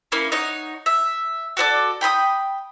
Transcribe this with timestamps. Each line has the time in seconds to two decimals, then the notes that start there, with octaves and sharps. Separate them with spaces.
0.12 A#3 C#4 E4
0.32 D#4 C#5 F#5
0.86 E5
1.57 F#4 A4 C5 D5
2.01 G5 B5 C6 D#6